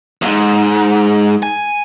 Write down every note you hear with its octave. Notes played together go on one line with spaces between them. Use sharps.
E2 G#2
G#5